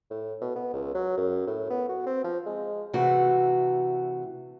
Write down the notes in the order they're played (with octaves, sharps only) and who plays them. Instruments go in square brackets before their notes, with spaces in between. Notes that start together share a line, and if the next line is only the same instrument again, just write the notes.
[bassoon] A2
B2
B3
C#2
F#3
F#2
A2
B3
F#4
C4
F3
G#3
[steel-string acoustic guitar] C3 E3 A3 F#4